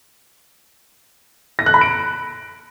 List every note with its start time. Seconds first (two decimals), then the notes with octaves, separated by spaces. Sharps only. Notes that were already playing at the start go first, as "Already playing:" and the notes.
1.59 A#6
1.66 F#6
1.74 B5
1.81 D7